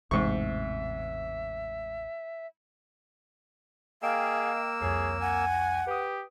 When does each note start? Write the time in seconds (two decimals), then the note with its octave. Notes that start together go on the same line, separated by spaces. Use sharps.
0.11 A1 E2 G#2 C3 E5 C#6
4.03 A#3 G#4 D#5 F5 G5 E6 D7
4.81 C2 F2 G#4 C#5
5.21 F#5 G#5
5.87 G4 B4 D#6